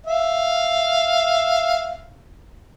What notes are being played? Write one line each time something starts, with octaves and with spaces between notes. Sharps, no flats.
E5 F5